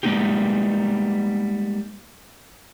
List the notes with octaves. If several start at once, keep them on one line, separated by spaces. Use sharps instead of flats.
G3 G#3 A#3 B3 D#4 G4